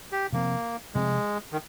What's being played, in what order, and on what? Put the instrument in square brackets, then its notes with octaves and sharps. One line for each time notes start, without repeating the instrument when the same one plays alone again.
[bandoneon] G4
[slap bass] C3 F3 C4 [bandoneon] A#3
[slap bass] C3 F3 C4 [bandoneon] G#3
[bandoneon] D#3